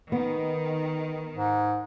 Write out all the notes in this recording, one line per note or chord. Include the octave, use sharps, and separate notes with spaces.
D#3 B3
G#2